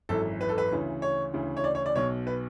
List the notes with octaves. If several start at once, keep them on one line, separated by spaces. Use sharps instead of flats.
G#1 F#2 E3 A4
B4
A4
B4
D2 C#3 E3
C#5
D2 C#3 E3
C#5
D5
C#5
D5
B1 B2 C#5
B4